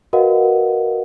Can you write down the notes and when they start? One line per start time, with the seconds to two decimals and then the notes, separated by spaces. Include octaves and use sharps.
0.13 F#4 A#4 B4 D#5 F5 F#5